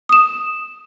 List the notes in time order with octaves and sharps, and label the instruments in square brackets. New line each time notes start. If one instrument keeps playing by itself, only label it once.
[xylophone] D#6 E7